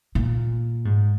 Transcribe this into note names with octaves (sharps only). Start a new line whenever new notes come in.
A#2
G#2